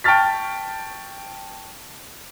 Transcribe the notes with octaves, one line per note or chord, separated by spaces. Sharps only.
G5 A5 C#6 F6 A6 B6